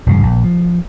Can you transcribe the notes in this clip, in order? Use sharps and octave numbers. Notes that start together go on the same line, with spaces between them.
E1 G2 C#3
A#1
F3